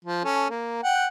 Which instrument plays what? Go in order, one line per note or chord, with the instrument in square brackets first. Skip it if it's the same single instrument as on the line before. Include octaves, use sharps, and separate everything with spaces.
[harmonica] F3
C#4 A4
A#3
F#5 G5